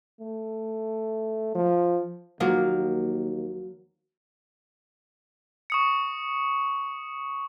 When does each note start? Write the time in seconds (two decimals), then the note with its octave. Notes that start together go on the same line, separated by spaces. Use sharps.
0.20 A3
1.55 F3
2.40 D#2 F3 F#3 A#3
5.70 C#6 D#6 C#7